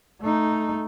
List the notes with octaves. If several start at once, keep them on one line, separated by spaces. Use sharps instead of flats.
A3 D#4